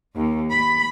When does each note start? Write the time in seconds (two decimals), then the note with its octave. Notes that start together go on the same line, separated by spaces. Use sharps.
0.16 D#2
0.52 B5